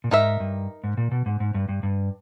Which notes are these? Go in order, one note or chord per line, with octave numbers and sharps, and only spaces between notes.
A#2
G#2 D#4 A#4 E5
G2
G#2
A#2
B2
G#2
G#2
G2
G2
G2